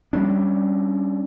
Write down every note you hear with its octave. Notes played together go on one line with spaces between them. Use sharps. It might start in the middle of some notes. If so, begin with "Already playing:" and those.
G3 A3 C#4 D4